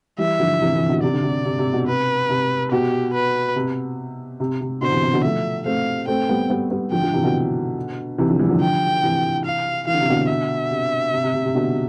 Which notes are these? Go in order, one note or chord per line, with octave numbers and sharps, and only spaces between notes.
E3 G3 E5
D3 F3
C3 E3
C3 E3
B2 D3
C3 D5
D3
C3
C3
C3
B2
C3 B4
C3
B2 G4
B4
C3
C3
C3
B2 D3 C5
C3 E3
C3
B2 D3
F3 A3 E5
A3 C4 F5
A3 C4 G5
G3 B3
G3 B3
G3 B3
D3 F3 G5
D3 F3
C3 E3
B2 D3
C3 E3
D3 F3
E3 G3
D3 F3
G5
C3 E3
F5
E3 F5
D3
C3
B2 D3
E5
C3
C3
C3
C3
C3
B2 D3